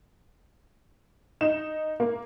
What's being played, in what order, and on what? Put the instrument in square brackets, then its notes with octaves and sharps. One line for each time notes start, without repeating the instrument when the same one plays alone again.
[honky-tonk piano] D#4 E7
A#3